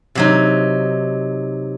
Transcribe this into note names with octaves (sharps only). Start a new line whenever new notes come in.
C3 F#3 D#4